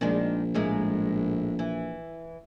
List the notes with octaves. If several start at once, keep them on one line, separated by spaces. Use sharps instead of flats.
A#1 D#3 G#3 D4
A2 G#3 A#3
E3